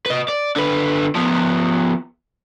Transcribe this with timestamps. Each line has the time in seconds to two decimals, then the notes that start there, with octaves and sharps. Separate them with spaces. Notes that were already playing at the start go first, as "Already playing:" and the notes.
0.06 B4 D#5
0.28 D5
0.56 D3 B4
1.15 F3 B3